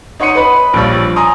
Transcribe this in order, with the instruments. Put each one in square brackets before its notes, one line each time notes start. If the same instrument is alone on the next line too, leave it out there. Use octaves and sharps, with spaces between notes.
[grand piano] D#4 C#5 F#5 C6 C#7 D#7
B4 B5
A#1 F3 G3 C#5
G#5 A#5 C6 D#6